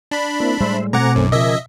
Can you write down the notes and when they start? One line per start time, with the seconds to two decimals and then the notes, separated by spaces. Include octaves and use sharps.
0.11 D4 B5
0.40 A#3 C4 E4
0.60 A2 G3 G#3 C5 E5
0.93 B2 A3 C4 F#5 G#5 A#5 D6
1.16 B1 F#2
1.32 C#3 F3 A#4 D#5 E5 G#5